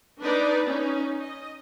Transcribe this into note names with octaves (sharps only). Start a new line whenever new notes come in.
D4 D#4 B4 D5
C#4 D#4
D#5